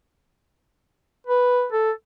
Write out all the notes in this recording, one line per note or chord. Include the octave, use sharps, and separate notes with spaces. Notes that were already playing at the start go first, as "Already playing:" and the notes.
B4
A4